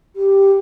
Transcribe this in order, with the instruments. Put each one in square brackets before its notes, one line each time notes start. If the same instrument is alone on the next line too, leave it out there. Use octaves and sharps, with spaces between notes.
[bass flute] G4